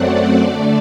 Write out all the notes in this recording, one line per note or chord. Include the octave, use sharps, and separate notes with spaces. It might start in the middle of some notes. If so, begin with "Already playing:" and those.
Already playing: F#2 F#3 A3 C4 D5 F#5
D3 A3 D4